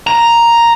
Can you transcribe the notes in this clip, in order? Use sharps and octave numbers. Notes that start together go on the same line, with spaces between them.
A#5